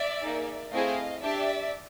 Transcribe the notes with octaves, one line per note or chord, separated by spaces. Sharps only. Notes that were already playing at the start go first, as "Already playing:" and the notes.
Already playing: D5 E5
A#3 D#4 G#4
A3 C4 E4 G#4 D#5 F5
D4 G4 D5 E5